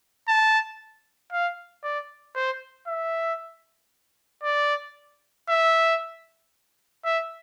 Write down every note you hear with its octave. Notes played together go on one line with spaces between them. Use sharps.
A5
F5
D5
C5
E5
D5
E5
E5